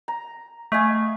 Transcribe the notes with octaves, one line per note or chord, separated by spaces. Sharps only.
A#5
A3 D#5 F5 G#5